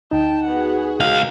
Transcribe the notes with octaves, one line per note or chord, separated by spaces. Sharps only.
D2 D#4 G5 A5
B3 F#4 G#4 F#5
C#2 A#4 F5